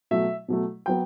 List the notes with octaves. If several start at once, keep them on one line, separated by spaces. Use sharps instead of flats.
B2 F#3 A3 E5
B2 F#3 A3
F#3 B3 G5